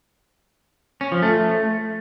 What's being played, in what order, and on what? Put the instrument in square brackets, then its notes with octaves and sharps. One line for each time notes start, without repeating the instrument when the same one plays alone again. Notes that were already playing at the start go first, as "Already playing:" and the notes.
[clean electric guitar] C#4
F3
A3